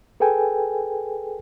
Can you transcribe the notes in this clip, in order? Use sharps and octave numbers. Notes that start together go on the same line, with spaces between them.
G#4 A4 B4 G5 G#5